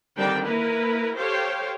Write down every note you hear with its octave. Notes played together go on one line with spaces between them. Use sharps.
D3 D#3 G3 C4 D4 G5
A#3 E4 A#4 B4
G4 A4 C5 C#5 F5 G5